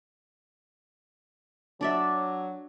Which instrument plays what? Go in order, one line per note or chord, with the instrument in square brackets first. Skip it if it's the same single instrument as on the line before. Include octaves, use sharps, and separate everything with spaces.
[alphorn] F#3 [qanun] D4 D5 E5